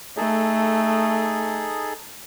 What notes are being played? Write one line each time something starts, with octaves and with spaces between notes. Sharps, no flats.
A3 D#4 G#4 A4